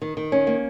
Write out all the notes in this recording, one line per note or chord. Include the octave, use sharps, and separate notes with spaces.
D#3
D#3
C#4
A#3